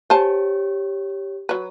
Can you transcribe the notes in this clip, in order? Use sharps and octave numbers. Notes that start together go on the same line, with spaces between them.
G4 C5 C#5 G#5 A5
F#3 B4